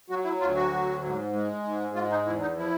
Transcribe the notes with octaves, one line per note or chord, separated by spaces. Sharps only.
F#3 F#4
E4
D2 F4
F#4
F#3
G#2
G#3
G#2
G#3 F4
D#4
E2 E4
D#4
F3 E4